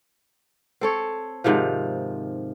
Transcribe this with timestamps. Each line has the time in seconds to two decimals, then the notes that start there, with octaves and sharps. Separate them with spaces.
0.81 C4 A4 C#5
1.44 G#2 C3 D#3 F3